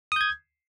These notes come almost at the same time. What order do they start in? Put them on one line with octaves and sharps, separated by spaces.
D#6 G6 G#6